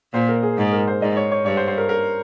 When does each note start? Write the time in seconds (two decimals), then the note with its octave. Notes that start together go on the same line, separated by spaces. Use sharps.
0.13 A#2 C5
0.29 A#4
0.43 G#4
0.58 G#2
0.72 A#4
0.88 C5
1.02 G#2 D#5
1.17 C#5
1.31 C#5
1.45 G2 C#5
1.57 C5
1.68 C5
1.78 A#4
1.89 A#4